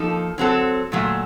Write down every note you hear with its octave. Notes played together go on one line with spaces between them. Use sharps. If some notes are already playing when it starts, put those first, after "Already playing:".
Already playing: F3 A#3 D#4 A4
F#3 C4 F#4 A4
A#2 F#3 A3